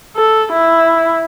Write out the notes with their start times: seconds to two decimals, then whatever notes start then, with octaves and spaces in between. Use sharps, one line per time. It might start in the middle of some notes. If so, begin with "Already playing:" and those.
0.16 A4
0.53 E4